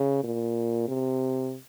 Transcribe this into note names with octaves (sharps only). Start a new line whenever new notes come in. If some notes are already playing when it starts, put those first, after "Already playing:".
Already playing: C#3
A#2
C3